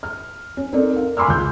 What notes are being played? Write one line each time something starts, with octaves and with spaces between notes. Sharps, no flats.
F6
C#4
C4 D#4 A4 A#4 D5
A#4 F5
G#5 B5 C6 D6 E6 F6
C#2 F4 G6